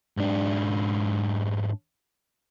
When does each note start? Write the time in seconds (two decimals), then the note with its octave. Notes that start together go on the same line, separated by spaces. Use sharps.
0.17 G#2 D4